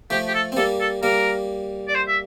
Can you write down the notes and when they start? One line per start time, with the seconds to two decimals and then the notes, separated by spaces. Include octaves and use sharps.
0.10 F3 A3 G4
0.27 G4
0.34 A4
0.52 C4
0.57 G3 A#3 A4
0.80 A4
1.03 G3 A#3 A#4
1.88 D5
1.95 C5
2.08 E5